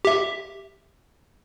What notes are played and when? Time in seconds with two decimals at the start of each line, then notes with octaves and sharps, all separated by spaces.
0.05 G4 E5